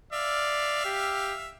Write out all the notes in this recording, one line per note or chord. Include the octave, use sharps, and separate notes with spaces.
D5 E5 F5
G4